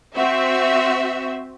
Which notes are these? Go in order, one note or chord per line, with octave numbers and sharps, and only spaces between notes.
C4 F#4 E5